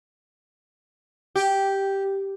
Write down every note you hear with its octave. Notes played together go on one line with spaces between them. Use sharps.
G4